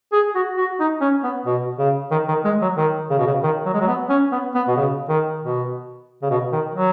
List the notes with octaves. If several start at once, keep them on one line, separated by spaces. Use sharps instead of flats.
G#4
F#4
F#4
D#4
C#4
B3
B2
C#3
D#3
D#3
G#3
F#3
D#3
C#3
B2
C#3
D#3
F#3
G#3
F#3
B3
C#4
B3
B3
B2
C#3
D#3
B2
C#3
B2
D#3
F#3